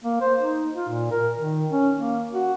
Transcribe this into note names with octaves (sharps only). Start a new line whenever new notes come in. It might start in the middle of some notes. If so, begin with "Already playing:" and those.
A#3
C5
D#4
F4
A#2
A#4
D#3
C#4
A#3
F#4